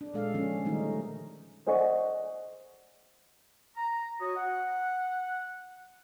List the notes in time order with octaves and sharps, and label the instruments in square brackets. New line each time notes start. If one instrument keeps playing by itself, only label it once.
[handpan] D4
A#2 G#3 A4 F5
D3 F3 C#4
D#3 G3 A3 D#4
[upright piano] C5 D5 D#5 F#5 C#6
[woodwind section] A#5
F#4 C#5 D#5
F#5